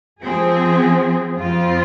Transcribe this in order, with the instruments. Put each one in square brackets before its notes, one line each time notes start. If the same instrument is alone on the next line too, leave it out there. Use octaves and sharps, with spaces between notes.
[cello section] F3 C4 G#4
F2 F3 C4 F4